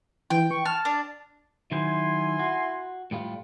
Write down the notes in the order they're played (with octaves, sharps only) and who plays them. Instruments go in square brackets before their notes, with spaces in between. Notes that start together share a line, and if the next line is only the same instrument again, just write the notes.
[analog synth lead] E3 [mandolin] G5
[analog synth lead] C#6
[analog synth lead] A5 [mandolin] F6
[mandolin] D4
[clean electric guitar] D#3 F#3 C5 [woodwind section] E4 G#5 C6
[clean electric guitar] F#4
A2 G3 F4